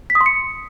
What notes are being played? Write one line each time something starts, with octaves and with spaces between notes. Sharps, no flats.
B6
D#6
C6
C#7